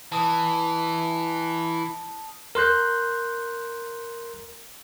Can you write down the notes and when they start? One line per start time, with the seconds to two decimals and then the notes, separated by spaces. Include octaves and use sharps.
0.12 E3 A5 D#6
2.55 A#4 C6 F#6 G6